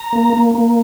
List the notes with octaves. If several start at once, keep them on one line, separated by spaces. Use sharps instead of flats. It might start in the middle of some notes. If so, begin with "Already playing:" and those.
Already playing: A#5
A#3
A#3
A#3